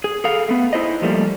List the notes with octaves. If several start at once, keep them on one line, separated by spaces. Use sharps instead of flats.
G#4
G#4 A4 F5
A3 B3
D#4 E4 C5 D#5
F3 G3 A3 A#3